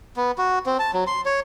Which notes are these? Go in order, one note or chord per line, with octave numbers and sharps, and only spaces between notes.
B3
F#4
C4
A5
F#3
C6
C#5